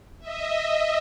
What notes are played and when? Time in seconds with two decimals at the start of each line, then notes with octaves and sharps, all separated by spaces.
0.19 D#5 E5